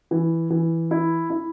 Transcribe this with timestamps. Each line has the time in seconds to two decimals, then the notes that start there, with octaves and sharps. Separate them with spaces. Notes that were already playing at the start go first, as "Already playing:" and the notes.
0.11 E3
0.50 E3
0.91 E4
1.30 E4